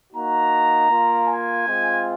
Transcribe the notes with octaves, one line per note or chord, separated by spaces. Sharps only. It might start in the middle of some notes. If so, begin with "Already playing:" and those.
A#3 D#4 F#4 A#5
A#3 F4
G#5
G#3 C4 F4